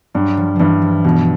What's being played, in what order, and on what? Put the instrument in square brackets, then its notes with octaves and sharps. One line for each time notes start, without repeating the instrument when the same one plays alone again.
[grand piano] G2 [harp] F#3
[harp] F3
[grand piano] G2 [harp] E3 F3
[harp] F3
[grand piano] B2 [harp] E3